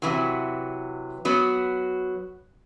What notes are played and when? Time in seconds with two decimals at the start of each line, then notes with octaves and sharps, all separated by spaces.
0.02 C3 E3 F#3
1.25 F#3 B3 F#4